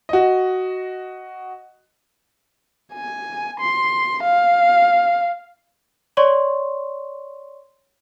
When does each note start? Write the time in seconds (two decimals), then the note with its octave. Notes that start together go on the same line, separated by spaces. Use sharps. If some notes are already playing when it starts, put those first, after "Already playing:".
0.09 F#4 D#5
2.93 G#5
3.60 C6
4.24 F5
6.17 C#5 D5 C6 C#6